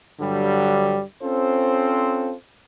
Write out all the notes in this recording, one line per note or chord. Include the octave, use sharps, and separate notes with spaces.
G2 D3 F#3 G3
C4 C#4 F4 A4 C5